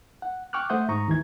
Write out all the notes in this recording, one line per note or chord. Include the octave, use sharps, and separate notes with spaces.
F#5
G5 C#6 D6 F6 F#6
A3 C5 E5 F#5 D#6 G6
G#2 A#5 C#6 D#6
D#2 E3 G#6